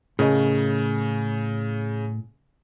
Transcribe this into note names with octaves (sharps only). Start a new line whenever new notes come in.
A2 C#3 A#4 D#5